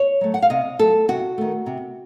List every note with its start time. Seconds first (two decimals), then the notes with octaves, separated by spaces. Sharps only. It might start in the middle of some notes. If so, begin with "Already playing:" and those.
Already playing: C#5
0.21 F#3 A3
0.34 F#5
0.42 F5
0.50 C3 D#5
0.79 F#3 A3 A4
1.08 C3 F#4
1.38 D#3 A3
1.66 C3